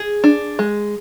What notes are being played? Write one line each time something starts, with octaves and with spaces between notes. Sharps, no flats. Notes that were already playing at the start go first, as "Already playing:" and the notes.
Already playing: G#4
D4
G#3